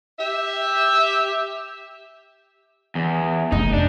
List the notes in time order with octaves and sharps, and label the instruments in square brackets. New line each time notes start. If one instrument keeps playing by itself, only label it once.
[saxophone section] G4 E5
[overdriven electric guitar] E2
[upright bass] F1 [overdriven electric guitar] D#4
[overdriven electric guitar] D4